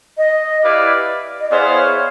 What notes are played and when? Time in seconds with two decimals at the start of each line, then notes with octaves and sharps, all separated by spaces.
0.18 D#5
0.62 E4 G4 B4 D5 F5
1.40 D#5
1.50 B3 E4 G#4 C5 D5 F5
1.73 C#5